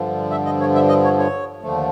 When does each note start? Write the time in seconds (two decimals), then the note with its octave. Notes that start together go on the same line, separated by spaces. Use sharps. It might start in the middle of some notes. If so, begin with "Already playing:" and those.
Already playing: G2 D3 F3
0.31 E5
0.46 D#5
0.60 C#5
0.75 E5
0.89 D#5
1.04 C#5
1.19 C#5
1.62 D#2 D3 F3 A3